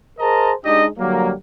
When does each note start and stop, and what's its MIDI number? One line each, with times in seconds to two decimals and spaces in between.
0.20 0.53 68
0.20 0.53 70
0.20 0.53 72
0.20 0.53 75
0.20 0.53 81
0.20 0.53 82
0.64 0.86 56
0.64 0.86 62
0.64 0.86 63
0.64 0.86 67
0.64 0.86 75
0.99 1.32 50
0.99 1.32 54
0.99 1.32 55
0.99 1.32 58